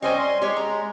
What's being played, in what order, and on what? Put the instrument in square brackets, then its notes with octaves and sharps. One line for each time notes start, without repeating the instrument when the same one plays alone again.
[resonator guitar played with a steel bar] G3 C5 G#5 [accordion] C4 C#4 D#5
[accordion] C6
[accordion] G#3 [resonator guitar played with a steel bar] G4 C#5
[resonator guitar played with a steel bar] A#5